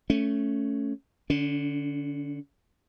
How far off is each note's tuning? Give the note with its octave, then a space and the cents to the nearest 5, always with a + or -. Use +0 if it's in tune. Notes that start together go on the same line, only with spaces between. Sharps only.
A3 +0 C#4 +0
D3 +0 C#4 +45